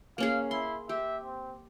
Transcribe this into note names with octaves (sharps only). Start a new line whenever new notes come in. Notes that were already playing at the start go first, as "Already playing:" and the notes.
A#3 C#4 G#4 F5
E4 C6
G4 E5
C4